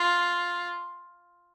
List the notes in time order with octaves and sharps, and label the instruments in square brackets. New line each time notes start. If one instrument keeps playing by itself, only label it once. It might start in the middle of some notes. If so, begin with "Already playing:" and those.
Already playing: [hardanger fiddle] F4